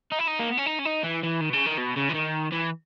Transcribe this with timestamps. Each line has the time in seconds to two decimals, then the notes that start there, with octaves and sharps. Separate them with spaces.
0.12 D#4
0.19 E4
0.28 D#4
0.40 A#3
0.49 B3
0.58 C#4
0.66 D#4
0.79 C#4
0.85 D#4
1.03 E3
1.23 E3
1.40 D#3
1.49 B2
1.53 C#3
1.66 D#3
1.78 B2
1.97 C#3
2.10 E3
2.15 D#3
2.52 E3